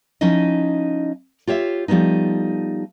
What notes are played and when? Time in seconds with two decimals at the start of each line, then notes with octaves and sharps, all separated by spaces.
0.21 F3 C#4 D#4 E4 D#5
1.47 F4 G4 C#5 E5
1.88 F3 G3 A3 B3 D#4